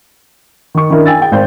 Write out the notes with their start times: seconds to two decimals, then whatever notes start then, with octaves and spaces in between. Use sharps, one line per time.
0.74 D#3 C#6
0.90 D#3 C#4 D4 E4 A#4
1.06 G5 G#5 E6 A6
1.19 G#4 G5
1.32 G#1 C5 G6